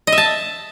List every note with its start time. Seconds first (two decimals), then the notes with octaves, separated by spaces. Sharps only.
0.07 D#5
0.12 E5
0.18 A5